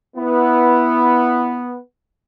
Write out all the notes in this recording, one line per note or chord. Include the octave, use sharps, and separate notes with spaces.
B3 E4